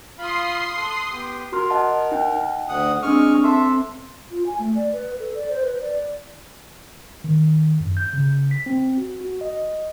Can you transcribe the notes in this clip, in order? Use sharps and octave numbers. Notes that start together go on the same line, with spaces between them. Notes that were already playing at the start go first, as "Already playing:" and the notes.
F4 F5 B5 C6 D#6 C7
A4 F#6
B3 G4
F#4 A#4 C6 F6
D#5 F#5 A5
D#4 F#5 G5
D2 F#5 D#6
G#3 C4 D4 C#6 D#6 F6
C4 A4 E5 C6
F4
G#5
A3
D5
B4
A4
D5
C5
B4
D5
D#3
F#2
G6
C#3
B6
C4
F#4
F#4
D#5